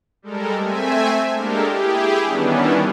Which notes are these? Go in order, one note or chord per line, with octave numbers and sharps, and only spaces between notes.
G3 G#3 A4 A#4
A3 C4 E5 G#5
G#3 A#3 D4 G4 A4 A#4
E4 G4 G#4
D#3 E3 G3 B3 C#4 D4